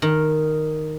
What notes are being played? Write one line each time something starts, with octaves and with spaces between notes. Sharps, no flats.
D#3